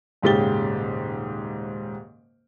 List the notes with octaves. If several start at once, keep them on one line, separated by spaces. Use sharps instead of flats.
D#1 G#2 C#3 G4 A6 G7